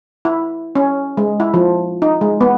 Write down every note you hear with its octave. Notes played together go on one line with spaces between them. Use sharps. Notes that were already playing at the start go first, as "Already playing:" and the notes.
E4
C#4
G#3
E4
F3
D#4
G#3
B3